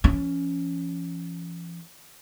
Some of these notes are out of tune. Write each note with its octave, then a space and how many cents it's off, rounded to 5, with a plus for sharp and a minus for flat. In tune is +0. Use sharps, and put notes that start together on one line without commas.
F3 -40 C#4 +5